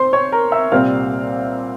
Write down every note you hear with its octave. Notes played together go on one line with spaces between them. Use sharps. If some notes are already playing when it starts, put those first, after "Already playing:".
Already playing: C4 C5 C6
C#5 C#6
A#4 A#5
E5 E6
C2 A#2 G3 C4 F5 F6